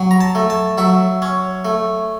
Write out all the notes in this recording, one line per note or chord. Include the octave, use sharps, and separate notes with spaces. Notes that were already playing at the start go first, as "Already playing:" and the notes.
Already playing: F#3
A#5
A5
A3
A5
F#3 E5
C#4
A3